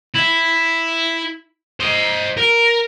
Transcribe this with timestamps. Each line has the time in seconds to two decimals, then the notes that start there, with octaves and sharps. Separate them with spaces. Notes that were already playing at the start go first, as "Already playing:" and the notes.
0.15 E4
1.80 C5 D#5
2.37 A#4